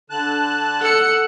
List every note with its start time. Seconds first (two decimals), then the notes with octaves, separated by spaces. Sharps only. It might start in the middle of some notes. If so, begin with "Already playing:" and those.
0.10 D3 A5 F#6
0.81 A4 F#5 C#7